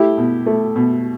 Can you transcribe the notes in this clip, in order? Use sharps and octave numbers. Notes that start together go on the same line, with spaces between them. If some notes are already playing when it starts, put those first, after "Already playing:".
Already playing: A3 E4 G4
B2
A3
B2